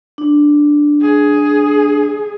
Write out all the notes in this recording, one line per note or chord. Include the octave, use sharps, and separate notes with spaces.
D4
G#4